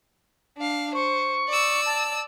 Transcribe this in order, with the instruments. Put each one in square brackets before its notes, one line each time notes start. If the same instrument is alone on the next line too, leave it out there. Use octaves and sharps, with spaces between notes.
[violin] D4 F5
[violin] C5 [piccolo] C#6
[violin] D5 E6
[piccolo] A5